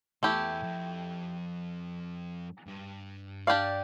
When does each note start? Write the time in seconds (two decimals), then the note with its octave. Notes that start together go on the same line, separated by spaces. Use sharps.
0.23 E2 A3 E4 G4
0.63 F2
2.67 G2
3.47 D4 G4 D5 F5